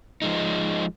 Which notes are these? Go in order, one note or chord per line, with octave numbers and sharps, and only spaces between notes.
F3 G#3 D#4